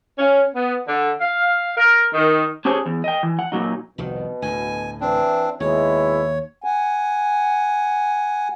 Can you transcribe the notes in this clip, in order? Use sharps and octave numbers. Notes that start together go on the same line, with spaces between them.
C#4
B3
D3
F5
A#4
D#3
C#4 D4 G4 G#4 C5 C#5
E2
D#5 G5
E3
F#5
A#2 F#3 D#4
C2 F2 B2 D#3
D2 A2 G#5
E3 C4 D4
D#2 B2 G#3 E4 C#5
F#5 G#5